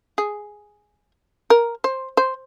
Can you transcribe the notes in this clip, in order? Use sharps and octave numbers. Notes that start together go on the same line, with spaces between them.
G#4
A#4
C5
C5